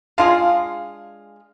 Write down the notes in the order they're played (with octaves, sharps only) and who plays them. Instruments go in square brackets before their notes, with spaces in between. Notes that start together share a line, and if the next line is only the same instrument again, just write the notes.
[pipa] G#3 D4 F4 G#4 [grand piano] F5